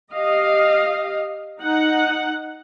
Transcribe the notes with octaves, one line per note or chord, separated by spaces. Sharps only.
G4 D#5 F5
D#4 F#5